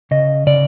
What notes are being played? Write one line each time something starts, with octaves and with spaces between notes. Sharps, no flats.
C#3 D#5
C#3 D5